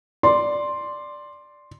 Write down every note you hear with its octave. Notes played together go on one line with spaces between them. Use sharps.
D5 C6